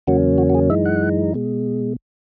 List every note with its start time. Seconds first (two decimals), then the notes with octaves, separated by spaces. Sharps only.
0.07 E2 C#3 F#3 A#3 C#4 F#4
0.38 F#4
0.50 F#4
0.54 G#4
0.70 F#2 E3 G#3 D#4 E5
0.85 F#5
1.34 B2 G#3